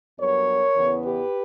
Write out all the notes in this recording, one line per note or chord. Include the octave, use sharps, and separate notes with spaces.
G2 F#3 B3 A#4 C#5
E2 C#3 E3 B3
G4 B4